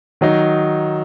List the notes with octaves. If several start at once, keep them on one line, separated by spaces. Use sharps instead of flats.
D#3 F#3 D#4